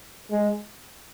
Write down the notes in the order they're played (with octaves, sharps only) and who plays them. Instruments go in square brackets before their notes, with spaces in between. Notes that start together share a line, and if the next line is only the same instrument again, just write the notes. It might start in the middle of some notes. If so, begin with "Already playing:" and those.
[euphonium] G#3